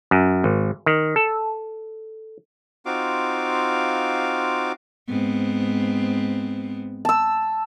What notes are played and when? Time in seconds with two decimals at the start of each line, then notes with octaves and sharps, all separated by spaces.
0.11 F#2
0.44 G#1
0.86 D#3
1.16 A4
2.86 C4 D#4 F4 F#4 F5 D6
5.08 G#2 B3 C4
7.05 A5 E6